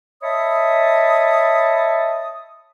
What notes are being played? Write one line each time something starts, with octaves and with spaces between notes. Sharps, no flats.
C#5 D#5 E5 A5 B5 D#6